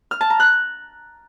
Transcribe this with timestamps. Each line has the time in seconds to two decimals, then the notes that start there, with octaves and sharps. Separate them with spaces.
0.11 F6
0.21 A5
0.30 A#5
0.40 F#6